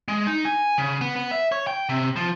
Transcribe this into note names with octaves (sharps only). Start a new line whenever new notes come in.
G#3
D#4
G#5
C#3
B3
B3
E5
C#5
G5
C3
F3